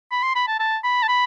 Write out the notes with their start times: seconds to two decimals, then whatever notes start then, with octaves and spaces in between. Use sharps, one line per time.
0.11 B5
0.23 C6
0.35 B5
0.48 A5
0.60 A5
0.84 B5
1.03 A5
1.08 B5